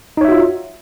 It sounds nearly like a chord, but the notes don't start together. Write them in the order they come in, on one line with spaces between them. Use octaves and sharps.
D#4 C#5 E5 F#4 F4